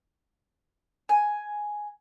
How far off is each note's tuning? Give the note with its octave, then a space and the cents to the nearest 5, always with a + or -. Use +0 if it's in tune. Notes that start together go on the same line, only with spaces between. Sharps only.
G#5 +5